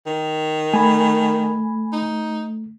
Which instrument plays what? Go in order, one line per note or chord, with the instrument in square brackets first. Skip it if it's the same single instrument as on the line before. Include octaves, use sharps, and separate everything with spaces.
[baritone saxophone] D#3
[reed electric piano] A3 [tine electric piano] G#5 B5
[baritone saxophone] D#4